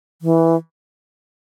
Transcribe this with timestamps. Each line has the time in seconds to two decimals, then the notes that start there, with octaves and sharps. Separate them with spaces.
0.22 E3